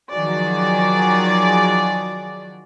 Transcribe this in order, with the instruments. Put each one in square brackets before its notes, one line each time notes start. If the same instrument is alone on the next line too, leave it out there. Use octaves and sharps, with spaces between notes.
[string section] D#3 F3 F#3 F#4 G#4 D5